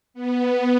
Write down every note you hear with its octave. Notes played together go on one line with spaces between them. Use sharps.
B3